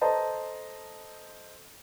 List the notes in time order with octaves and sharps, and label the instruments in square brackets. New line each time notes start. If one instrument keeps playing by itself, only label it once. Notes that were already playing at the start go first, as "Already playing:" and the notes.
[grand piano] A4 C5 D#5 A5 A#5